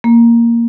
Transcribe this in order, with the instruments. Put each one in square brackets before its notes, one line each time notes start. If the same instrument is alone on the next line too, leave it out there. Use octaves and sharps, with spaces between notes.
[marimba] A#3